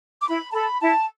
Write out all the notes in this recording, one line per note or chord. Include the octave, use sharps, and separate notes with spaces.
D6
E4 B5
A5
A4 B5
E4 A5